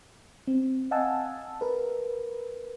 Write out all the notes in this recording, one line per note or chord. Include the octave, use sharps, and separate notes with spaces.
C4
D#5 F5 F#5 G#5 A5 E6
A#4 B4